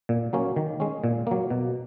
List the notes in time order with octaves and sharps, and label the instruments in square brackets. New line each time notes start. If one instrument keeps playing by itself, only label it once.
[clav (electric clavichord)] A#2
F#3 A#3 C#4
D#3
G#3 C#4
A#2
F#3 A#3
B2